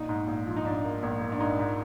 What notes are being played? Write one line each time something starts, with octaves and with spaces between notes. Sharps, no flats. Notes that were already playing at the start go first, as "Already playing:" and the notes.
Already playing: A#1 D#4
G#2
A#1
F3
D#4
G#2 D4
A#3
A#1
A#3
D4
G#2 D#4
G#2